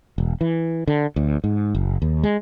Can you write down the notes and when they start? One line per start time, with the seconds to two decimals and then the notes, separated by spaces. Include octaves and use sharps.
0.18 E1
0.41 E3
0.87 D3
1.16 D2
1.44 G#2
1.75 F#1
2.02 D#2
2.23 G#3